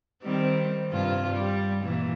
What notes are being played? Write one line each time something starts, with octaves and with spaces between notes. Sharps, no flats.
D#3 G3 C4
G2 C3 F4
G3
A#2 E3